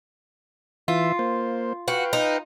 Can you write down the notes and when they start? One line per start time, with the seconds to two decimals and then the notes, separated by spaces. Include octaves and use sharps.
0.88 E3 F4 E5
1.19 A#3 C5
1.88 F#4 B4 F5 G5
2.13 D#4